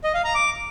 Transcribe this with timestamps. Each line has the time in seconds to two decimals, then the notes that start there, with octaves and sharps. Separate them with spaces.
0.04 D#5
0.14 F5
0.24 A#5
0.35 D6